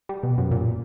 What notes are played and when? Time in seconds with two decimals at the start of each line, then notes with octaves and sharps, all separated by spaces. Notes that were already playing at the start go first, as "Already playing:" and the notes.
0.09 G3
0.23 B2
0.38 F#2
0.51 A#2